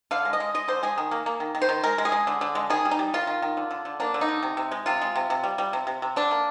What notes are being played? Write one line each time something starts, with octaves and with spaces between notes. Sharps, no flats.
D3 F5
G#3
D#5
G#3
G#3 D#5
D3 C5
G#3 G#4
D#3
A#3
A#3
D#3
D#3
C5
D#3
G#3 A#4
G#3
G#4
G#3
D3
D3
G#3
D#3 G#4
G3
D#4
G3
D#3 F4
D#3
D#3
D3
D3
D3
A#3 D4
D3
D#4
D3
C3
C3
G#3
C3 F4
G#3
C3
C3
G3
G3
C3
C3
C3
D3 D4
A#3